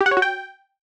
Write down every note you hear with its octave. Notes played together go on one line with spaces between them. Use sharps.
G4
F#5
C#5
F#4
G5